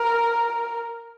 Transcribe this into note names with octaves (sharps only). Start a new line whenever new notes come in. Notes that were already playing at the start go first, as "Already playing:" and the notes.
Already playing: A#4